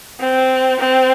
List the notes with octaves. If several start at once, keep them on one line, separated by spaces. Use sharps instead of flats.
C4
C4